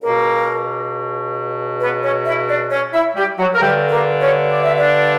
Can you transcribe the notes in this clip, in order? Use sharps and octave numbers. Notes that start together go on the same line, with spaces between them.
C#2 B2 A#3 A#4
B3 B4
C#4 C#5
E4 E5
D4 D5
C#4 C#5
E4 E5
G3 G4
F#3 F#4
A#4
G2 D3 G3 G4
A#3 A#4
C#4 C#5
D5
E5
D4 D5